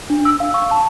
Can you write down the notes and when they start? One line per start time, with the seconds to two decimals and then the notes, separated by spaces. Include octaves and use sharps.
0.10 D4
0.25 E6
0.40 F5
0.54 C#6
0.71 A5